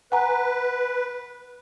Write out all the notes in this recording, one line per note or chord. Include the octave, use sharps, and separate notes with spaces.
B4 F#5 G#5 A#5